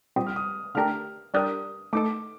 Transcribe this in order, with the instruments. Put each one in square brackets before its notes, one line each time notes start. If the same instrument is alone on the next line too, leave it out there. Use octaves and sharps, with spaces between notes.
[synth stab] A#2 G3 C4 G4 [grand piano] D#6
[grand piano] F6
D#6
[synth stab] D3 A3 D4 G4 A#4 [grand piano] F6
[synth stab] G3 D4 G4 A#4 [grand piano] D#6
[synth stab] A3 D#4 A4 [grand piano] D6